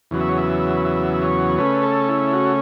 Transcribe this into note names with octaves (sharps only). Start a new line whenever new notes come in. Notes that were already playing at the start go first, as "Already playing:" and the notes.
E2 C#3 F#3 B3
E5
C#5
E5
E5
C#5
C#3 A3 C#4 B4
A4
E4
F#4